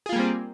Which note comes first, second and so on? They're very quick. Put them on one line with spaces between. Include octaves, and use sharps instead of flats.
G#4 F4 A#3 G3 C4